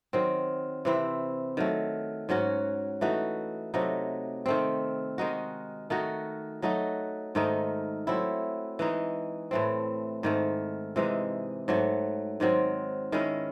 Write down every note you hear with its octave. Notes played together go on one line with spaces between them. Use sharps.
D#3 F#3 C4
C3 E3 C4 E4
D#3 F#3 A3
G#2 F#3 C#4 F#4
E3 A3 D#4 F#4
C3 F#3 A3 D#4
D#3 A3 C4
D#3 G#3 D#4 F#4
D#3 A3 D#4 F#4
F#3 A3 D#4 F#4
G#2 D#3 A3 D#4
F#3 A3 C4 E4
E3 G#3 D#4
A2 E3 A3 C4
G#2 D#3 A3
C3 E3 G#3 D#4
G#2 F#3 A3
G#2 D#3 F#3 C4
D#3 G#3 C#4 E4